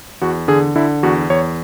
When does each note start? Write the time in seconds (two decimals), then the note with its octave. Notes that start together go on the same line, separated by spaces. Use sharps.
0.22 E2 F#4
0.48 D3 G#4
0.76 D3 E4
1.03 E2 F#4
1.30 E2 C#5